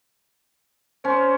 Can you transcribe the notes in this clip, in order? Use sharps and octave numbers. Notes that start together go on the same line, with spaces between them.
C#4 C5